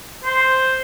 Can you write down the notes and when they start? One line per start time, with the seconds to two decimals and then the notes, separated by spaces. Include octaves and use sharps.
0.25 C5